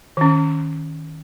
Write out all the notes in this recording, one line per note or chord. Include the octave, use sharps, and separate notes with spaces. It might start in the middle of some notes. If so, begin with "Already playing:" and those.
D#3 C#4